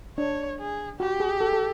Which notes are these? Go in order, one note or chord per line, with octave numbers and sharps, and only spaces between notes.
D4 C#5
G#4
F#4 G4
G#4
A4
A4